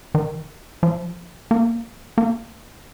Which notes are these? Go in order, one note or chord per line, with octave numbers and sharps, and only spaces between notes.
D#3
F3
A#3
A#3